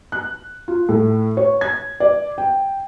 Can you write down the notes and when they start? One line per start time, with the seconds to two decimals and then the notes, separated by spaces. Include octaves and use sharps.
0.12 F#6
0.68 F4
0.89 A2
1.37 C#5
1.61 G#6
2.00 D5
2.38 G5